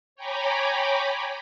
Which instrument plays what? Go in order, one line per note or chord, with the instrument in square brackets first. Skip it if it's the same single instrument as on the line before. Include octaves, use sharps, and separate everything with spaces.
[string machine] C#5 G5 G#5 A#5 B5 D6